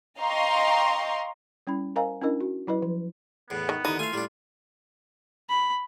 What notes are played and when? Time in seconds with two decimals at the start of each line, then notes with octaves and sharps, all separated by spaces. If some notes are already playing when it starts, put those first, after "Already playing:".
0.20 D#5 F5 G5 A#5 C6 C#6
1.67 G3 C#4 E4 B5
1.96 A#4 C5 D#5 F5 G#5 A#5
2.21 C#4 D4 E4 A#4 D#5
2.41 F#4
2.67 F#3 E4 B4 D#5
2.82 F3
3.50 E2 A2 B3
3.69 D#3
3.85 D#2 D3 E3 D#4 D#6
3.99 A3 F4 F5 G#5
4.13 A2 G3 D4
5.50 B5